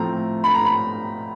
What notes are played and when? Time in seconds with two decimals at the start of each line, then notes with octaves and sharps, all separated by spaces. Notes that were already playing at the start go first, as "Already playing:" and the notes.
Already playing: A2 F3 A3 C4 A#5
0.44 B5
0.54 A#5
0.65 B5